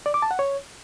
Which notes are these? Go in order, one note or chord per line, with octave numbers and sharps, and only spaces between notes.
D5
D6
A5
F#5
C#5